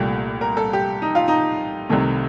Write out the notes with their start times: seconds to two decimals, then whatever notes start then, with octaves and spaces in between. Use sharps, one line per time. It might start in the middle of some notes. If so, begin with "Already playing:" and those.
Already playing: C2 A#2 A3 G4
0.41 A#4
0.57 A4
0.73 G4
1.02 D#4
1.15 F4
1.28 D#4
1.89 C2 C3 D#3 A3